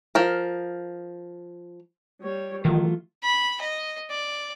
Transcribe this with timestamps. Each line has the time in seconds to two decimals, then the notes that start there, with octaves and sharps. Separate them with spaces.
0.15 F3 A#4
2.21 G3 C#5
2.65 D#3 E3 F#3 A3 F4
3.23 B5
3.61 D#5
4.10 D5